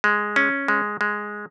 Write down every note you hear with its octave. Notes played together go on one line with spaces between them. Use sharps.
G#3
C#4
G#3
G#3